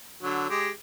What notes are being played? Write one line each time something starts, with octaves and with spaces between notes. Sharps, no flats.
D3 F#3
G#3 G4